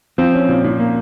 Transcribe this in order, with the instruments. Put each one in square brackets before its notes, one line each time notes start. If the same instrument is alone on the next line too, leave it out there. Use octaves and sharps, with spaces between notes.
[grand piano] F3 [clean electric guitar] C4
[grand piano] C#4
A#2
A#2
A#3